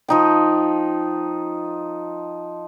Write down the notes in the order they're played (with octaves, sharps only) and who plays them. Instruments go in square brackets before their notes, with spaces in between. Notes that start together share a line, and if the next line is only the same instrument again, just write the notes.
[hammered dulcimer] F3 D#4 G5